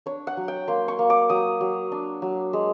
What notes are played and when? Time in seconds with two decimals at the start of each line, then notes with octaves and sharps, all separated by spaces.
0.06 D4 C#5
0.27 F#5
0.37 F#3
0.48 G5
0.68 A#3 C6
0.88 C#6
0.99 A#3
1.10 D6
1.29 F#3 D#6
1.61 F#3
1.92 D4
2.22 F#3
2.53 G#3